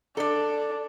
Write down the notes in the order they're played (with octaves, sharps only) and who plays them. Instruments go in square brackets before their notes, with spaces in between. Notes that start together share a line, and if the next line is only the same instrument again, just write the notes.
[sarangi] D4 [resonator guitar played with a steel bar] A4 D5